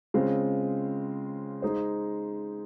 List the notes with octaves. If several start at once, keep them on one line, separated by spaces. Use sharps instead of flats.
C#3 G#3 C4 F4
G#3 D#4 G#4 C5